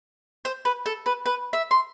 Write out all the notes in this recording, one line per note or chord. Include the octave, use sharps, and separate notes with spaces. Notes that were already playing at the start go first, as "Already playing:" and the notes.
C5
B4
A4
B4
B4
E5
C6